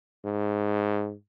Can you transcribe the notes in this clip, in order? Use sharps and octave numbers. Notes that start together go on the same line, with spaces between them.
G#2